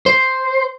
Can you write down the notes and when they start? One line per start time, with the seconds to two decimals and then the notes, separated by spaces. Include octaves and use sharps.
0.06 C5